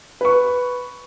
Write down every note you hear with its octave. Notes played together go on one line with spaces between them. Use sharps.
B4 C#6